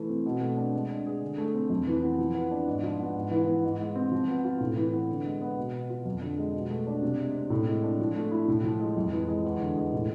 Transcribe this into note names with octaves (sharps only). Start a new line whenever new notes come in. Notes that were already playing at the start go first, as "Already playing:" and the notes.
Already playing: E3 A3
C4
B2
A3
D4
G#3
D4
G#4
D3
A3
C4
F2
E3
B3
F3
B3
D4
G#2
F3
B3
G#2
E3
B3
G#2
G#3
C4
F3
B3
F4
A2
E3
B3
D3
G#3
B3
B2
B3
F4
F2
D3
G#3
B2
A3
D4
C3
G#3
C4
A2
G#3
D4
F3
A3
E4
A2
F3
G#3
F2
E3
G#3
E2
D3
G#3
A2